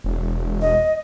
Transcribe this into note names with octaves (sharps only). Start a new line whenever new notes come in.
E1
D#5